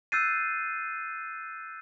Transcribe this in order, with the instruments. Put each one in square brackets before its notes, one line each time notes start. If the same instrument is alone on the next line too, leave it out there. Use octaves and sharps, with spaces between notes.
[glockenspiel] E6 F#6 G6 A6 C7 D#7